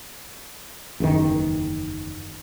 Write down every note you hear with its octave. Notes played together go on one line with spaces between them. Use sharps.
F#1 E2 G#2 D#3